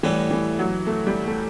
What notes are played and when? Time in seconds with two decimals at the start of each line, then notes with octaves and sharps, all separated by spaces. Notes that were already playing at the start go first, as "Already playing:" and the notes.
0.03 A2 E3 G3 B3
0.31 E3
0.59 F#3
0.87 A3
1.07 G3
1.27 A3